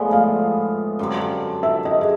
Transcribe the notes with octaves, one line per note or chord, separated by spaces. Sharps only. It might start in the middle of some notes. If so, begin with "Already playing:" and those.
Already playing: A2 F3 G#3 B3 D5 E5
F5
F#2 D3 G3 C4
E5
D#5
G#4